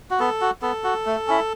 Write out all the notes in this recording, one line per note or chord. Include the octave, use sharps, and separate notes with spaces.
F#4
B3 A4
F#4
B3 A4
F#4
A3
C#4 E4